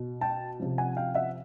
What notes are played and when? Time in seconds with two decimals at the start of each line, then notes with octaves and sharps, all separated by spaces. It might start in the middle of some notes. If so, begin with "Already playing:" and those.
Already playing: B2
0.21 G5 A5
0.59 C3 F3
0.78 F#5 G#5
0.97 F5 G5
1.15 E5 F#5